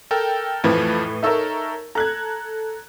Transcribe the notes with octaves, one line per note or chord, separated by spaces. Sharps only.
A4 A#4 G5
F2 A2 E3 F3 B4 G#6
D#4 A4 A#4 C#5 E5 E6
A4 A#5 F#6 G#6